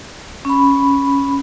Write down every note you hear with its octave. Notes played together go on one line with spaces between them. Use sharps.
C#4 B5